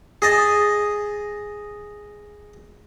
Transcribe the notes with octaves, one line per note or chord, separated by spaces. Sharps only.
G#4 D#5 A5